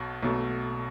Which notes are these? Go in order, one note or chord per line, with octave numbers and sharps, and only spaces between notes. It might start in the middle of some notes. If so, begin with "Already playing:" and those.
Already playing: B1 B2
B1 B2 A3